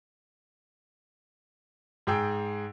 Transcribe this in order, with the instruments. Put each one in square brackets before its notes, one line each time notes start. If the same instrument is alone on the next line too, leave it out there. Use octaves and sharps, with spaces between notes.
[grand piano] G#2 G#4 G5 E6